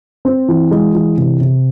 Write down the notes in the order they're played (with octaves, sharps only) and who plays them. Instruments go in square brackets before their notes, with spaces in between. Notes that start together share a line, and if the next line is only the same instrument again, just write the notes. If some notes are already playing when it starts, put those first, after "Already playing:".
[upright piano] C4
E3
G#3
E3
C3
C3